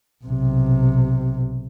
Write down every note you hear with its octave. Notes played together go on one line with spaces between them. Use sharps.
B1 C3